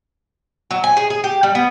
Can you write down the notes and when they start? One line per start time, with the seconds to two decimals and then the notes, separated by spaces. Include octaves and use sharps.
0.71 F#3
0.84 G#5
0.97 G#4
1.10 G#4
1.24 G4
1.43 G3
1.55 B3